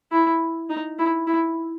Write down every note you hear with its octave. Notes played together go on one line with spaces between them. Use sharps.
E4
D#4
E4
E4